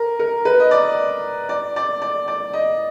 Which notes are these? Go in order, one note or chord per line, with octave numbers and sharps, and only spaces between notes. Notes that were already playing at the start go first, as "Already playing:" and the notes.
Already playing: A#4
A#4
B4
D#5
D5
D5
D5
D5
D5
D#5